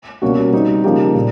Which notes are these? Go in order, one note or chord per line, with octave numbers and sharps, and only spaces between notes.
B2 G3 A#3 C#4 F#4
G3 C4 D#4
C#3 F3 A#3 D#4 G4
A#2 G3 A#3